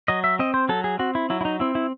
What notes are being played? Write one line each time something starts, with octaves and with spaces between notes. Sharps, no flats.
F#3 D#5
E5
C4 D#5
C5
F#3 A4
G#4
C4 F#4
E4
F#3 E4
E4
D#4
C4 E4
E4